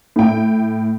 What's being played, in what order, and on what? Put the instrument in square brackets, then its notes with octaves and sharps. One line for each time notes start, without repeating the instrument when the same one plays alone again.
[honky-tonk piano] A2 G5